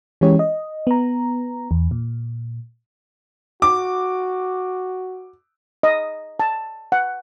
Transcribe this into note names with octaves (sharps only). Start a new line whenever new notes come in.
E3 G#3 C#4 G4 C#5
D#5
B3 A#5
E2
A#2
F#4 D6
D#5
A5
F#5